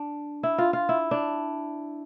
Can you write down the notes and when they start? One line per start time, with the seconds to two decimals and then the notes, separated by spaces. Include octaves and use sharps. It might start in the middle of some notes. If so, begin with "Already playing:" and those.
Already playing: D4
0.43 E4
0.58 F4
0.73 F4
0.89 E4
1.11 D4